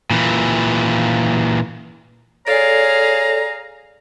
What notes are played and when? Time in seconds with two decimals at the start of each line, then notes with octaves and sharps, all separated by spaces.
0.11 A#2 E3
2.47 G#4 A4 C#5 D5 F5 A#5